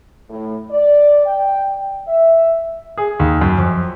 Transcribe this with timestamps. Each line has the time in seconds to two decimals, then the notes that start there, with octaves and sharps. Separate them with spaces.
0.30 A2
0.71 D5
1.26 G5
2.07 E5
2.98 G#4
3.20 D#2
3.41 F#2
3.58 F2